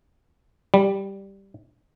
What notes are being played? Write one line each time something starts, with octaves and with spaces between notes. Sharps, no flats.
G3